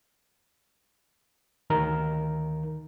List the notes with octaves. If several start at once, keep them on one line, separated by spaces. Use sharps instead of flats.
D2 D#3 A#4